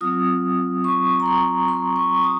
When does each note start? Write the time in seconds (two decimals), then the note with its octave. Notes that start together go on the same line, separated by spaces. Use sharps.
0.01 F#3 C4 F4 D#6
0.84 C#6
1.20 A#5
1.26 C6
1.68 C6
1.96 C#6
2.24 D#6